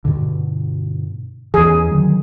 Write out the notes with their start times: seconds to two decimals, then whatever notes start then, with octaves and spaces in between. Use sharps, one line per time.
0.05 G2 B2 D3
1.54 E2 E3 G#4
1.91 D3 D#3 F#3